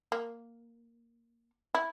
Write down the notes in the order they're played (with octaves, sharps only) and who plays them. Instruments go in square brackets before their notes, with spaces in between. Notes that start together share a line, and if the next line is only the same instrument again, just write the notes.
[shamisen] A#3
E4